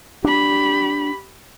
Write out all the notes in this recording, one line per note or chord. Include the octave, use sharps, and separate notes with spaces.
D4 G4 B5